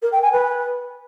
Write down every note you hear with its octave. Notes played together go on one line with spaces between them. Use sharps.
A#4
G5
G#5
B4